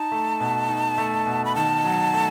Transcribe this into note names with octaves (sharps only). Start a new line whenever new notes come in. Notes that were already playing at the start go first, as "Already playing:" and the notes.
Already playing: D#4 A5
A3
B2
D#4
A3
B2
B5
D#3 A5
F#3
A3